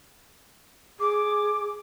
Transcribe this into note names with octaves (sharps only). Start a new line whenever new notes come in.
G#4 D6